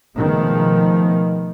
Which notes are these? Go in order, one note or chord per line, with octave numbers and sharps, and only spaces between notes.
B2 D#3 F3 G#3 A3 B3